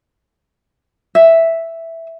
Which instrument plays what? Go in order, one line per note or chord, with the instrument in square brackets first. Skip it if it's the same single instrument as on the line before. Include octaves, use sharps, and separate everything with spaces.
[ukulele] E5